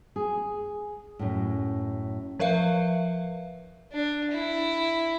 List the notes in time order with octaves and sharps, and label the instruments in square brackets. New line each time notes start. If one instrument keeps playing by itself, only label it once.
[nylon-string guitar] G#4
F#2 A2
[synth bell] F3 A#4 B4 E5 F5
[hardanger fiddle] D4
E4